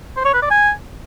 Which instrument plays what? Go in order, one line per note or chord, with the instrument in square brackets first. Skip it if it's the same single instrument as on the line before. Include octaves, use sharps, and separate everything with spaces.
[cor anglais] C5
C#5
B4
D5
G#5